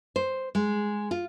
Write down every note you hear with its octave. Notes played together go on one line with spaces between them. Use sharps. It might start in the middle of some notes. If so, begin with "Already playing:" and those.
C5
G#3
F4